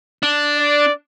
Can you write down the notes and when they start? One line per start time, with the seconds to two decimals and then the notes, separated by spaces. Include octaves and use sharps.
0.23 D4
0.58 D5